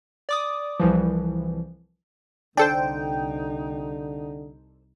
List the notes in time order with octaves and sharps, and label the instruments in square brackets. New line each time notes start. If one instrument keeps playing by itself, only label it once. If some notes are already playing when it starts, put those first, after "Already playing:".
[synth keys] D5 D6 D#6
C2 E3 F3
[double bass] C2 D#4 [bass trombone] D3 [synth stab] D4 A4 C5 [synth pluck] G5